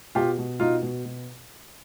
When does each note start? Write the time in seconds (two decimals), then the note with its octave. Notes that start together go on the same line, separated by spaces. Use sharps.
0.15 B2 F4 G4
0.38 B2
0.60 B2 D#4 F4
0.83 B2
1.05 B2